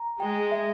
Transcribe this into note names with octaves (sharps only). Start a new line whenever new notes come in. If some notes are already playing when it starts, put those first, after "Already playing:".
Already playing: A#5
G#3 G5
E5